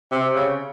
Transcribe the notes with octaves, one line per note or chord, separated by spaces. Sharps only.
C3
C#3